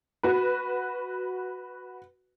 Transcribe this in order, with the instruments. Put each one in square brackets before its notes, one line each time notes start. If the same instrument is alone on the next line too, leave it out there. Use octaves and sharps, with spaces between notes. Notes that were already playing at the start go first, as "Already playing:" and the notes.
[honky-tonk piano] F#4 B4